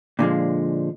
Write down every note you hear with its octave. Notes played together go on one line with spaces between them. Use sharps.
A#2 D3 F3 G#3